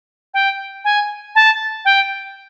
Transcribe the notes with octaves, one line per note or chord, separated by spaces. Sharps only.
G5
G#5
A5
G5